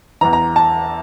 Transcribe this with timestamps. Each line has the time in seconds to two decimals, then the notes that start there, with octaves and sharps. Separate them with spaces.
0.21 E2 E3 A#5
0.33 A#5
0.56 A5